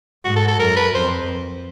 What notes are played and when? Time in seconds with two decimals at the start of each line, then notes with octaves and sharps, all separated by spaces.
0.24 G#2 F#4
0.36 A4
0.47 A4
0.59 F#2 A#4
0.76 B4
0.94 F2 C5